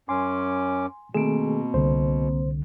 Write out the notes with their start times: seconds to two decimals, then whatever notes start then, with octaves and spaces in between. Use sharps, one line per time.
0.09 F#2 C#4 G#5 C6 D6
1.14 B2 D#3 A3 A#3 C4 G#4
1.74 C2 D3 C5